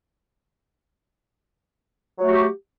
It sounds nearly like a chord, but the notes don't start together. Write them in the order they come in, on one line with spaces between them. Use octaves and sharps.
F#3 A3 F#4 G4